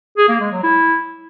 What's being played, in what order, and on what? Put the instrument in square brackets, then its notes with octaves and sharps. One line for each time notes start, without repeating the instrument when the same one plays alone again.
[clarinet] G#4
A#3
G#3
F#3
E4